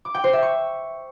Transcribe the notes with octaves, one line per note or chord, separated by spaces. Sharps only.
D6
G5
C5
E5
C#6